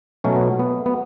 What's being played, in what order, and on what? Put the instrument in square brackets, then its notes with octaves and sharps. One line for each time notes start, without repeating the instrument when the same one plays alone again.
[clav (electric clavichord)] B2 F#3 A3 C#4
B3
B3
B3